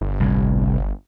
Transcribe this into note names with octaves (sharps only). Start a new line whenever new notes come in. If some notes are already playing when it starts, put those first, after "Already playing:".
G1
C2 A2